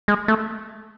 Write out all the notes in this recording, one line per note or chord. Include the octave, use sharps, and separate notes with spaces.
G#3
A3